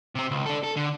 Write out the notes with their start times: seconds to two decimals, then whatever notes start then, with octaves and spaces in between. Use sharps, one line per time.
0.15 C3 C4
0.31 C#2
0.46 D4 A4
0.63 A4
0.77 D3